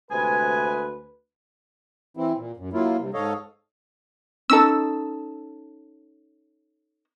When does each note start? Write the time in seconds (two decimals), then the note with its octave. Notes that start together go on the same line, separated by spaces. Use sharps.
0.11 D2 C3 G#3 B4 G#5
2.17 E3 C4 E4
2.37 A#2
2.57 F#2
2.73 F#3 A#3 E4 F4
2.99 G2 C3
3.14 G#2 A4 C#5 D#5 F5
4.50 C#4 D#4 A4 E6